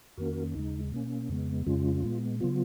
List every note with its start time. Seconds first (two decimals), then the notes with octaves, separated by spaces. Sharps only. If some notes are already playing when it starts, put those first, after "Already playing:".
0.17 F2 D#3 A#3 C#4 F#4 A#4
0.55 D#2 C#3 G#3 D#4
0.91 B2 A#3 C#4
1.29 F2 C#3 G#3 B3
1.67 F2 C#3 G#3 C#4 F4
2.03 A#2 G#3 B3
2.40 C#3 F#3 B3 F4